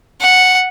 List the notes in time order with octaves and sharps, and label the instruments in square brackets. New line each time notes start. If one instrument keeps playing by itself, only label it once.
[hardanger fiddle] F#5